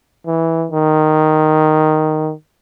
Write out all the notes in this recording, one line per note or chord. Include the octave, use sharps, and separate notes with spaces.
E3
D#3